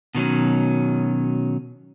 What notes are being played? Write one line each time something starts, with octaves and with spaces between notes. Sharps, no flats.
B2 D#3 F#3 C#4